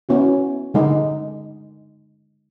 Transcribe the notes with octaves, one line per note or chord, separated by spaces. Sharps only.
B3 C#4 E4 F#4
D3 G#3 D#4